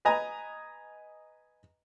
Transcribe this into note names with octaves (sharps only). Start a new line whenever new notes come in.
B4 D#5 G#5 A#5